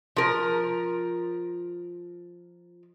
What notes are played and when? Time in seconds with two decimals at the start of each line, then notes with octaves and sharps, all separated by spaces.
0.16 F3 A#4